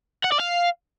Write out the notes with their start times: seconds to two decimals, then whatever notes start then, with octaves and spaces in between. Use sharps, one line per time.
0.24 F#5
0.32 D5
0.40 F5